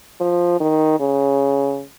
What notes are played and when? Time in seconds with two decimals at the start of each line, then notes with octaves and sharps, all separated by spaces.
0.20 F3
0.61 D#3
1.00 C#3